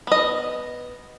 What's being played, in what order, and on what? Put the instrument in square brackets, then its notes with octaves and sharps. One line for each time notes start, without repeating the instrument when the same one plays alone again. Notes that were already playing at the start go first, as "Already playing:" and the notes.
[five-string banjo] B3 D#5